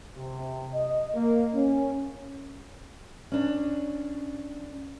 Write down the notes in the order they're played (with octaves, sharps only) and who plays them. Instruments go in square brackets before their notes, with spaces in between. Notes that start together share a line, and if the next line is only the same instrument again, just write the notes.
[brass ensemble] C3
D#5
A#3
C#4
[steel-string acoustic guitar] C#4 D4